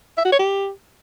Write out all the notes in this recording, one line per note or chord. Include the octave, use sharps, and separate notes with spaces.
E5
F#4
C#5
G4